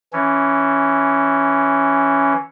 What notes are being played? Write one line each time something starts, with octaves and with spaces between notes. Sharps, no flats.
E3 C#4